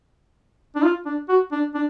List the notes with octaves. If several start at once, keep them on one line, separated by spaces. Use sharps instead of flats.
D4
F4
D4
F#4
D4
D4